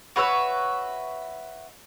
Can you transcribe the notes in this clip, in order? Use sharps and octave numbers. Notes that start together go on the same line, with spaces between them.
F#4 B4 C#5 E5